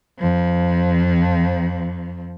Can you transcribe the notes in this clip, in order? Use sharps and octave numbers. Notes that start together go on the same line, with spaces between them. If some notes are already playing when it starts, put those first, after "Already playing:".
F2 F3